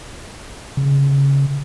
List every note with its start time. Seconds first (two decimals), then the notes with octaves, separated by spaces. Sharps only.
0.77 C#3